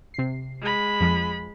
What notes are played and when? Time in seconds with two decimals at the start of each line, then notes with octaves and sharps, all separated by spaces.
0.14 C3 C7
0.61 G#3 B5
1.00 F2 F3